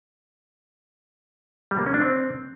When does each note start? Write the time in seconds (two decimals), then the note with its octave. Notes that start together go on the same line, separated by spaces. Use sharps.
1.71 G3
1.79 A#3
1.86 C#4
1.94 D4
2.02 C4